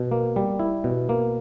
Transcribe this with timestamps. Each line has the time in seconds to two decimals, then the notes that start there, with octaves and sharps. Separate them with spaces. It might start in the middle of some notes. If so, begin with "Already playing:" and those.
Already playing: B2
0.11 A#3
0.36 G3
0.60 E4
0.84 B2
1.09 A#3